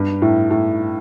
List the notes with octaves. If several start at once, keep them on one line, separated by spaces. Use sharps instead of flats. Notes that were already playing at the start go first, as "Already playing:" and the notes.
Already playing: G2
A2
A2